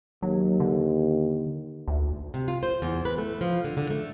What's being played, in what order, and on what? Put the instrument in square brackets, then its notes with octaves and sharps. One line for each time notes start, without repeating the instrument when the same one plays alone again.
[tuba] D#2 [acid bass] F#3
[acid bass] D3
D2
[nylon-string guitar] C3
F4
C5
E2
B4
A3
F3
D3
D3
A3